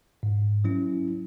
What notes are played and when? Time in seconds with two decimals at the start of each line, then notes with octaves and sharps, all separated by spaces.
0.23 G#2
0.64 F#3 C#4 E4